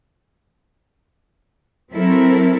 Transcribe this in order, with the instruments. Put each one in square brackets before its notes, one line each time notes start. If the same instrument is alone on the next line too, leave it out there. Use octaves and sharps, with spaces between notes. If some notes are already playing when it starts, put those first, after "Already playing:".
[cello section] F#3 C4 E4 A4 A#4